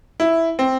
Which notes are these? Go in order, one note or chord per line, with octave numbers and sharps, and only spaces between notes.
E4
C4